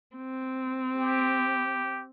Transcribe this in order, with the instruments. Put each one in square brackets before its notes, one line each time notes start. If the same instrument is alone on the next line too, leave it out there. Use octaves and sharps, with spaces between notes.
[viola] C4
[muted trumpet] G4